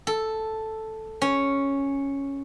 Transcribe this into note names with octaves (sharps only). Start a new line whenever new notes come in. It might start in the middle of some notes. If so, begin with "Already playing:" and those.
A4
C#4